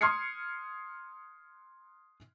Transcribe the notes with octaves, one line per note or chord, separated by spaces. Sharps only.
C6 D#6 F6 G#6 C7 C#7